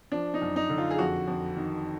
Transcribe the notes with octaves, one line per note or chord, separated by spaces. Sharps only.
F3 D4
D#4
F#2
D#4
D3
F4
G#4
F2 F#4
F2
D#3